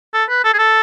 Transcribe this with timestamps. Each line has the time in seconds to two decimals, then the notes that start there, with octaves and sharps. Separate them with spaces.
0.14 A4
0.29 B4
0.44 A4
0.54 G#4
0.59 A4